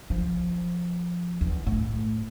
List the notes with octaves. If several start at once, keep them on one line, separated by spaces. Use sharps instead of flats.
F3
E2
A2